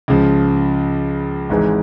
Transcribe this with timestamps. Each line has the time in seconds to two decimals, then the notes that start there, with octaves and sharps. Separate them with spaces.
0.08 C#2 C#3 F3
1.49 G#1 G#2 E3 G#3